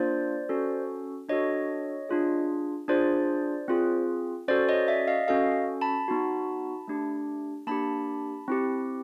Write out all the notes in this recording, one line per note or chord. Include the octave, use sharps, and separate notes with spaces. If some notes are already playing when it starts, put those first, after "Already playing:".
Already playing: A#3 D4 F4 C5 D5
C#4 F#4 A4
D4 F#4 A4 C#5 D#5
D4 F4 G#4
D4 F4 G#4 C5 D5
C4 F4 G#4
C#4 F#4 A4 C5 D5
C#5 D#5
D5 E5
D#5 F5
C#4 F#4 A4 D#5 F5
A5 B5
B3 D#4 F#4
A3 D4 G4
A#3 D4 G4 A5 B5
C4 E4 G4